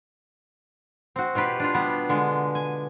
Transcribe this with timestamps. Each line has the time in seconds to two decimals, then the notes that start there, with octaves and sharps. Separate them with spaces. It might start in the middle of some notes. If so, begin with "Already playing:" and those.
1.16 C4 F#4
1.35 B2 F4 G4 B4
1.60 D4 F4
1.74 G3 B3
2.09 D3 G#3
2.55 G#5